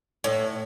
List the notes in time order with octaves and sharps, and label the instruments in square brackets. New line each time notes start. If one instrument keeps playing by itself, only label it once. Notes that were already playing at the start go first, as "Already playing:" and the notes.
[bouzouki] A2